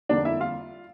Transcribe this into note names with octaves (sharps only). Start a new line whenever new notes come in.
F2 D3 G3 A#3 D4 D5
E4 E5
F4 F5